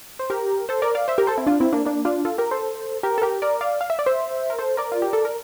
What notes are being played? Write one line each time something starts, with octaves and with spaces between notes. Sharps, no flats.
C5
G4 A#4
A4 C5
A#4 D5
D5 F5
C5 E5
G4 A#4
A4 C5
C4 E4
D4 F4
C4 E4
A#3 D4
A#3 D4
D4 F4
F4 A4
G4 A#4
A4 C5
G4 A#4
A4
G4 A#4
A#4 D5
D5 F5
F5
E5
D5
C5 E5
A#4
A4 C5
A#4 D5
F4
G4
A4
A#4